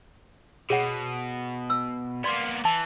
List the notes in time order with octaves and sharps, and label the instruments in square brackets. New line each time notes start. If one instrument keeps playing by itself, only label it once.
[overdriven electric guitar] B2 [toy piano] G#4 C#5 F#5
[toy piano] E6
[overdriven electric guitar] A#3 B3 [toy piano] D5 C6
[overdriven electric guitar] E3 [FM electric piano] A5